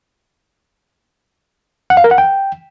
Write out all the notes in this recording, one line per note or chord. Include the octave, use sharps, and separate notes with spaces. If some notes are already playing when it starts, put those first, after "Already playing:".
F#5
F5
A#4
F#5
G5